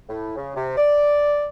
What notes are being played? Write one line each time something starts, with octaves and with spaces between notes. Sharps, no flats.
A2
C#3
C3
D5